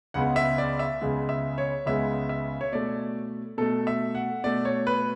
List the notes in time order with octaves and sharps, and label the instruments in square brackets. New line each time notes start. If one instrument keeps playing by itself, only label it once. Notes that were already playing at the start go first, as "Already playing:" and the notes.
[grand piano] C#2 C#3 G#3 B3 F#5
E5
D5
E5
C#2 C#3 G#3 B3
E5
C#5
C#2 C#3 G#3 B3 E5
E5
C#5
B2 A3 D5
B2 A3 A4
E5
F#5
B2 A3 D5
C#5
B4